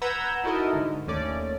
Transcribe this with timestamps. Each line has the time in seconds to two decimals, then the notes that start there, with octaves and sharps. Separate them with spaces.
0.02 B4 F#5 A#5 E6 G6 G#6
0.44 D#4 E4 F#4 A4 A#4 D#5
0.73 G#2 D3
1.07 D#2 A3 C#4 D5